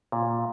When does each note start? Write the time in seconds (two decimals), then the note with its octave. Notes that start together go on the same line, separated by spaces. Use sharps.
0.12 A#2